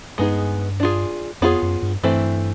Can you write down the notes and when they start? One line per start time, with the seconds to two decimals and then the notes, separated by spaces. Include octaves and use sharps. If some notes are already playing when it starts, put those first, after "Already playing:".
0.18 G2 G#3 B3 D#4 G#4
0.80 D4 F4 G#4
1.41 F2 B3 D4 F4 G#4 C#5
1.62 F#2
1.82 G2
2.03 G2 E3 A3 C4 E4